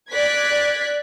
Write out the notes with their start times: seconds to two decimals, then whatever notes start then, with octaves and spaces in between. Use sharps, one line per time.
0.12 D5 F#6 G#6 B6